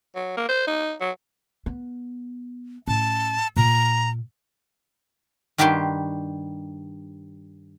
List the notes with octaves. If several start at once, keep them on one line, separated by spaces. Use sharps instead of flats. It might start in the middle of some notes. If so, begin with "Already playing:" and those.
F#3
A#3
C5
D#4
F#3
B3
A2 C#4 A5
A#2 A#5
G2 D#3 G3 F#4 G4 C6